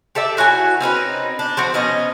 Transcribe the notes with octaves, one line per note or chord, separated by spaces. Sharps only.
G4 A4 D5 E5
E4 F#4 C#5 G#5
C4 C#4 D#4 B4
D4
F3 C4 F#4
B2 C#4 D#5